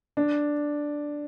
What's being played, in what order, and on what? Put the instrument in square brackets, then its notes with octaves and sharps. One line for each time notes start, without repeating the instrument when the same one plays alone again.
[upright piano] D4